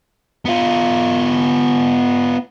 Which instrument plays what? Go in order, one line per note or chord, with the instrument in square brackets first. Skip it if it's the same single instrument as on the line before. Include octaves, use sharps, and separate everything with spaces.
[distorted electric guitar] B3 F4